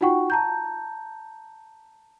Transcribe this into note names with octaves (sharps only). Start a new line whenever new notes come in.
D#4 F4 F#4 F#5 G5 C#6
A5 A#5 G6